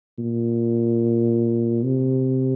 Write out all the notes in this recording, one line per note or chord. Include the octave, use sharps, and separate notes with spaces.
A#2
C3